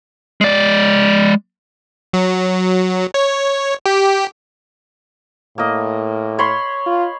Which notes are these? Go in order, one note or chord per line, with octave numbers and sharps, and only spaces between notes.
G#3 D5
F#3
C#5
G4
A2 A#3 D#5
C#5 B5 C6
F4